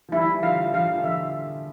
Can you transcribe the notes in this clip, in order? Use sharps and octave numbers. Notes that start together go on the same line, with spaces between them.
F3
E3 G3 E4
D3 F3 F5
D3 F3 F5
E3
D3 F3 E5